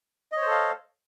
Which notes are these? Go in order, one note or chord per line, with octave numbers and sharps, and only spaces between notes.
A4 C5 C#5 D#5 F5